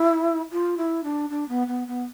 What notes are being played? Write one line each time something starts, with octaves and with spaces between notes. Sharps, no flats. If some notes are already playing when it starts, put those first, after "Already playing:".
Already playing: E4
F4
E4
D4
D4
B3
B3
B3